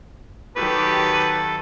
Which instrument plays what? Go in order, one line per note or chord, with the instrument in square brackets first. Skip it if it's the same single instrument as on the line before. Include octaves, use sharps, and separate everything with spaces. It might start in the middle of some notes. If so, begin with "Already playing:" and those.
[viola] D#3 F#3 [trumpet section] G4 [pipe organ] A4 [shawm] B4